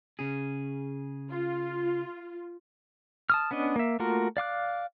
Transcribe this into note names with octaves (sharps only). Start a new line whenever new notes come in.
C#3 G#4
F4
A5 D#6 F6
B3 C#4 D4 D#5
A#3 E5
A3 A#3 F4 F#4 A#4
D5 F5 D6 F#6